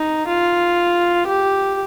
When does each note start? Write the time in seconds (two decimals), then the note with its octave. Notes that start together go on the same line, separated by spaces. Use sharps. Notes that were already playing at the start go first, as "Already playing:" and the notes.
Already playing: D#4
0.28 F4
1.27 G4